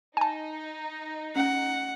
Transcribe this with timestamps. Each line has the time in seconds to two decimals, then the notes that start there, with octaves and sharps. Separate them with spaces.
0.17 D#4 G#5 A5
1.36 C#4 F#5